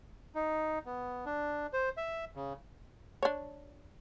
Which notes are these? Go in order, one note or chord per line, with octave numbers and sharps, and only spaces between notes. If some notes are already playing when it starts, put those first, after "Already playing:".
D#4
B3
D4
C5
E5
C#3
D4 C#5